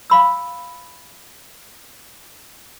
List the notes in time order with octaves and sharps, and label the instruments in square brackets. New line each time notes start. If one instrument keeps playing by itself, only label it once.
[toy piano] F5 B5 E6